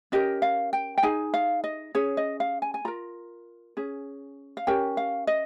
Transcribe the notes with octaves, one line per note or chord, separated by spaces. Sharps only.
C#4 G4 A#4 D#5
F5
G5
G5
D#4 G#4 G#5
F5
D#5
C#4 G#4 C#5
D#5
F5
G#5
G#5
F4 A#4 A#5
C#4 G#4
F5
C#4 G4 A#4 G5
F5
D#5